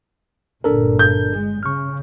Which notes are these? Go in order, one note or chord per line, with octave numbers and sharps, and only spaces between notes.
G1 A#2 D4 A4 A#4
G6
G#3
C#3 C#6 F6